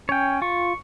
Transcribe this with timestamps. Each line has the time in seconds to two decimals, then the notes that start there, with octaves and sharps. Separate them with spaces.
0.09 C#4 C#5 G5
0.42 F4 C#6